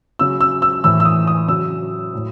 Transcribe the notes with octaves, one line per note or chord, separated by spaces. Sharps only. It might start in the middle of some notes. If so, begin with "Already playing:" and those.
C#3 F#3 E6
E6
E6
A2 E3 E6
E6
D#6
D#6
C#3 F#3 E6
A2 F#3